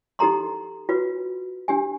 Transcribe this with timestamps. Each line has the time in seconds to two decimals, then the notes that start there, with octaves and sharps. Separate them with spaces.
0.19 D#4 G4 A4 A#5 C6
0.89 F4 F#4 B4
1.68 D4 G4 G#5